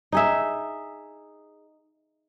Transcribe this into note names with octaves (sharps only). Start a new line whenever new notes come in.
D#4 G#4 E5